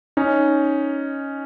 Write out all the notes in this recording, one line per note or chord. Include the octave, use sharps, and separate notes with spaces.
C#4 D#4